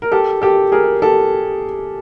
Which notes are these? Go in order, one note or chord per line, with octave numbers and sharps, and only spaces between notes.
A#4
G4 A4
G4 A4
G#4 A#4
G4 A4